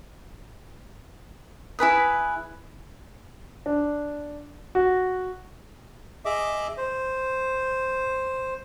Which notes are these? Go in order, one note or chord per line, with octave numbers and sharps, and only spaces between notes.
E4 G#4 B4 D#6
D4
F#4
G#4 D#5 E5 D6
C5